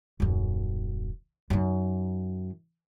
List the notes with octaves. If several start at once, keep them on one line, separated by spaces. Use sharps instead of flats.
D#1 F#2
F#2 D#3